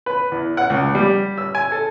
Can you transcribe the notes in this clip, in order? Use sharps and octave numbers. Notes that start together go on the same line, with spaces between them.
B4
E2
F#5
C#2
G3
E6
G#5
A4